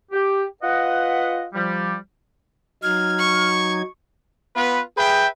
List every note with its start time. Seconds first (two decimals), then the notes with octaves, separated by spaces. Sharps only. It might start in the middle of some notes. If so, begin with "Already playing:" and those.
0.12 G4
0.62 F4 B4 D#5 F#5
1.54 F3 G3
2.83 F#3 D#4 F6 G#6
3.19 C#6
4.56 B3 F4 B4
4.98 G#4 B4 E5 G5